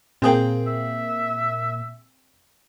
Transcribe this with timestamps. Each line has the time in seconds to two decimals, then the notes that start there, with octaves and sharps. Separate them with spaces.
0.22 A#2 A#3 C4 G#4 G5
0.67 E5